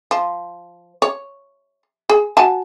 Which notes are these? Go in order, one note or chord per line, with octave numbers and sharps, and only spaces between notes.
F3
C#5
G#4
F#4 G#5 A5